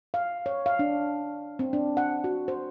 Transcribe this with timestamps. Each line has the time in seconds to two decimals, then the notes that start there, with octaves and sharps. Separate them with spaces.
0.14 F5
0.46 C#5
0.66 F5
0.79 D4
1.59 C4
1.73 D4
1.97 F#5
2.24 F#4
2.48 C5